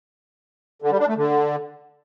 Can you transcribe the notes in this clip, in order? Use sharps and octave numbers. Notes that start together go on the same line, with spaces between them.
D3
G3
D4
A3
D3